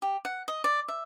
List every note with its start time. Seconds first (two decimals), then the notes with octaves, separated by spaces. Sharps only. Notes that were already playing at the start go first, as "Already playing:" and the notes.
0.02 G4
0.25 F#5
0.48 D#5
0.64 D5
0.88 E5